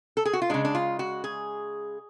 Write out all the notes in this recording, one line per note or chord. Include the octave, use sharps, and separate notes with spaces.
A4
G#4
F#4
F4
C#3 G#3 D4
D4
F4
F#4
G#4